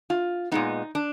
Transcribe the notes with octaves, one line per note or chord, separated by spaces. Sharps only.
F4
A#2 G#3 B3 D#4
D4